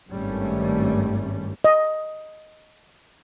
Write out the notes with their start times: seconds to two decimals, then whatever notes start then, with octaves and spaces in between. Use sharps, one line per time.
0.11 G#1 G2 G3 A3 C#4
1.64 D#5